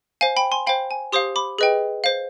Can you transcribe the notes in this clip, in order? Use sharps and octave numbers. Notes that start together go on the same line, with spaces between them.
C5 F5 G#5
G5 B5
G#5 C6
C5 F5 G5 B5
G#5
G4 C5 F5 C6 D#6
B5 D6
G#4 B4 D#5 G5
C5 F5